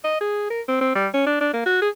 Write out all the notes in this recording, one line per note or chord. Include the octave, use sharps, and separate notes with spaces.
D#5
G#4
A#4
C4
C4
G3
C#4
D4
D4
A#3
F#4
G#4